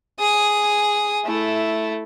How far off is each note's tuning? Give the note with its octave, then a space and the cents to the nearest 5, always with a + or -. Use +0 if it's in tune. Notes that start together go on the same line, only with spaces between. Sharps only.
G#4 +0 D#6 +0
A3 -5 E4 +0